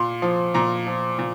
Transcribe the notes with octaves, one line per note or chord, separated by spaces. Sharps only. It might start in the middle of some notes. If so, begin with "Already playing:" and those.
Already playing: A#2 C6
F3
A#2 A#5
F3
A#2